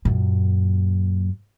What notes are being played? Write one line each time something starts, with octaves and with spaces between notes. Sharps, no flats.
F#2 A#2